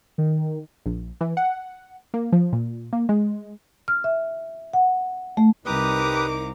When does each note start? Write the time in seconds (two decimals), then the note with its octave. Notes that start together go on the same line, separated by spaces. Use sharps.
0.18 D#3
0.86 A#1
1.21 E3
1.37 F#5
2.14 A#3
2.32 F3
2.53 A#2
2.93 A#3
3.09 G#3
3.88 F6
4.04 E5
4.74 F#5
5.37 A3
5.66 C2 D#4 G4 A#4 B4 A#5 D6 D#6